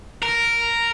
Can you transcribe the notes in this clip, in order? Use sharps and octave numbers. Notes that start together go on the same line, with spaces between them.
A#4